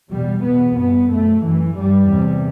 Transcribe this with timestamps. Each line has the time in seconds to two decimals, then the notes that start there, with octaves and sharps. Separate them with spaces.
0.10 E2 B2 G3
0.43 E2 B2 B3
0.76 G2 B3
1.10 F#2 A3
1.43 F#2 E3
1.77 G2 G3
2.10 E2 C3